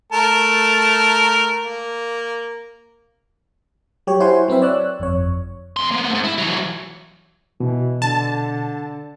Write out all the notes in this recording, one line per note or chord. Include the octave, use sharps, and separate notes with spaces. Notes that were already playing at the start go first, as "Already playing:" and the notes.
A3 A#4 A5
A#3
F#3 G4 C#5
E4 C5 C#5 F#5 G#5 C6
F#3 C4 B4 E5
C#5 D5 E6 F#6
G1 F2 C#5
F2 C6
A#3 B3
G#2 A3
E4
E3 F#3
B2 E3
D3 A5